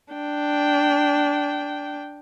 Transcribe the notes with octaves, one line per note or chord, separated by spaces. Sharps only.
D4 G5